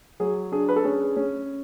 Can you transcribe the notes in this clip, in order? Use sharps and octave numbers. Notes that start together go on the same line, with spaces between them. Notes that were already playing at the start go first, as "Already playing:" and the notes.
F#3 G#4
D4 G#4
B4
A4
C#4 G#4
C#4